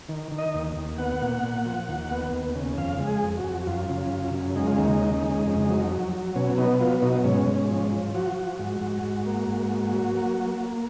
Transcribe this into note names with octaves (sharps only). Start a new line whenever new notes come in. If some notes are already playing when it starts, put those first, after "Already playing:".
D#3
D#3
D#5
D#2
D#2
B3 F#5
A#2
A#2
F3
D#2
B3
D#2
C#3
F2 F5
G#3
G#4
F2
F#4
F2
F#4
F#2 F4
C#3
F#2
C#3
G#3 D#4
F4
D#2 D#4
C#3
G#3
F2
F#3
F#3
F#3
B2 C#4
B3 D#4
F#3 F4
B2 D#4
G#2 C#4
G#2
F3
F3
F3 F#4
F3
G#2
G#2
G#2
A#3
G#2
A#3
F#3
A#3
A#3
A#3